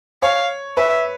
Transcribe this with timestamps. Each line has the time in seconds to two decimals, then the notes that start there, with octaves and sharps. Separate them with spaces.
0.22 C#5 F5
0.77 B4 E5